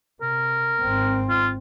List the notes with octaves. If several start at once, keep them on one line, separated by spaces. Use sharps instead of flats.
C3 A#4
G#1 C4
F4